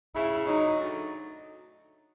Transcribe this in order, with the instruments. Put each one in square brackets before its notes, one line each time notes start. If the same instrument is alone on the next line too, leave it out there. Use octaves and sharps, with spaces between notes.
[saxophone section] C#3 [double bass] E4
[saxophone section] F#3 [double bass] D#4
[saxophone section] D2